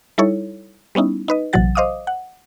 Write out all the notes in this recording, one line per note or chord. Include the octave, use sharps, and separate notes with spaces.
G3 D#4 E4 A4 C#5
G3 B3 C#4 D#4 E4
D#4 B4 D#5
A#1 C3 E3 F#3 F#5 A6
C5 D#5 F5 D6 D#6
F#5